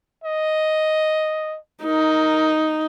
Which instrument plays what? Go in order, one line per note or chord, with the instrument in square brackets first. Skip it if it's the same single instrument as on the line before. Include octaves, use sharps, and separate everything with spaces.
[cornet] D#5
[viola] D#4 [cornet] A#4